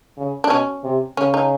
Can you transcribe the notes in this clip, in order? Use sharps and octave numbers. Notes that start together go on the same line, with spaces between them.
C#3
D4
B2 C#4
C3
C#3 C#4
D#4